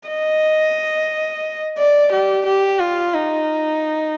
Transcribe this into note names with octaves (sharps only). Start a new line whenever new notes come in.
D#5
D5
G4
G4
F4
D#4